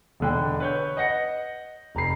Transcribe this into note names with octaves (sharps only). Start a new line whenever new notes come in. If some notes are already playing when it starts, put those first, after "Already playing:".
E1 D3 G5
B4 C#5 G6
D#5 F#5 A#6 C#7
F1 A#5 B5 C7